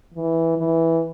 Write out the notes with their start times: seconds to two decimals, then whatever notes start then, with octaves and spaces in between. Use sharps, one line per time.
0.14 E3
0.58 E3